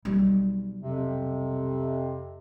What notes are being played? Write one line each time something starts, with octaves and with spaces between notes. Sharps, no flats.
B1 G3
F2 C3